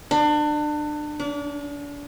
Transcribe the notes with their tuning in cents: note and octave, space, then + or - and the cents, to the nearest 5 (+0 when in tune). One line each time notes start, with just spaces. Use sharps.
D4 +30
D4 -35